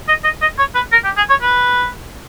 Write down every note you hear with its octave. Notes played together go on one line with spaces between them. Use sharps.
D#5
D#5
D#5
C#5
B4
A#4
G4
G#4
C#5
B4